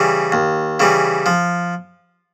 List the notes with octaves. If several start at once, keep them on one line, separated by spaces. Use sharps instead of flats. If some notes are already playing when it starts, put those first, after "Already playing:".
Already playing: C#3 E3 G3
D#2
C#3 E3 G3
F3